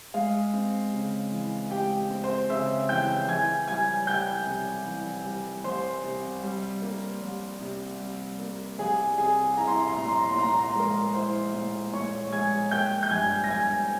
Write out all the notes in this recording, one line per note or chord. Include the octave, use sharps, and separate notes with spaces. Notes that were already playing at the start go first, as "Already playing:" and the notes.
G#3 F5
C4
C#3
E3
G#3 G4 G5
C4
C5 C6
C#3 E5 E6
E3 G5 G6
E3 G#5 G#6
G3 G#5 G#6
C2 G5 G6
C3
E3
G3
C2 C5 C6
C3
G3
A#3
C2
C3
G3
A#3
C2 G#4 G#5
C3 G#4 G#5
E4 A#5
C6
A#5
C6
A#2 A#5
C6
A#5
C6
A#2 A#5
C6
A#5
C6
G#3 A#4 A#5
E4 C5 C6
A#2
A#2 C#5 C#6
G#3 G#5 G#6
A#3 G5 G6
G6
G2 G#5 G#6
A#6
G2 G#5 G#6